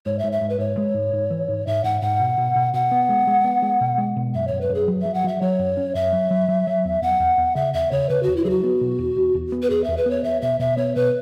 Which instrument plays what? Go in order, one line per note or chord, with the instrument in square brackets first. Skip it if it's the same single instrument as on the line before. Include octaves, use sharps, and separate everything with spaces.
[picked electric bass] G#2 [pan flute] C#5
[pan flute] E5
[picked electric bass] G#2
[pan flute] E5
[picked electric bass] G#2
[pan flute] B4
[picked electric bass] G#2 [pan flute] C#5
[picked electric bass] G#3
G#2
G#2
E3
G#2
[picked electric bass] G#2 [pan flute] E5
[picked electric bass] G#2 [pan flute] F#5
[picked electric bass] G#2 [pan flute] F#5
[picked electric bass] B2
B2
B2
[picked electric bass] B2 [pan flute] F#5
[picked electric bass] B3
G#3
G#3
B3
G#3
B2
G#3
B2
[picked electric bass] F#2 [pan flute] E5
[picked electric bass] F#2 [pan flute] C#5
[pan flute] B4
[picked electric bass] F#2 [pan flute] G#4
[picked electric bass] F#3
[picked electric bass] F#3 [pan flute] E5
[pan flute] F#5
[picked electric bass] F#3 [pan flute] E5
[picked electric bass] F#3 [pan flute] C#5
[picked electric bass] F#2
C#4
[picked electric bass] F#2 [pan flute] E5
[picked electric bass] F#3
F#3
F#3
F#3
E2
[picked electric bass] E2 [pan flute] F#5
[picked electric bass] E2
E2
[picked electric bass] C#3 [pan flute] E5
[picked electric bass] E2 [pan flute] E5
[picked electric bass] C#3 [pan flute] C#5
[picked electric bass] C#3 [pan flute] B4
[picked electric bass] E2 [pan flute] F#4
[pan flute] E4
[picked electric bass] F#3 [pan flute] G#4
[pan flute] F#4
[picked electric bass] B3
B2
E2
E2
E2
B3
[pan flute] B4
[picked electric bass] E2 [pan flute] G#4
[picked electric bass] E2 [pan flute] E5
[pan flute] B4
[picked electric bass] B3 [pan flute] C#5
[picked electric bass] E2 [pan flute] E5
[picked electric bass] B2 [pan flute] E5
[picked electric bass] B2 [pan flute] E5
[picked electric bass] B3 [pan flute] C#5
[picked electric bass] B2 [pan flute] B4